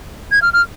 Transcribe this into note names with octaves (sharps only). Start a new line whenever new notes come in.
G#6
F6
F6